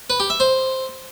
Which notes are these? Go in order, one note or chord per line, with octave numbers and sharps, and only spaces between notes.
B4
G4
E5
C5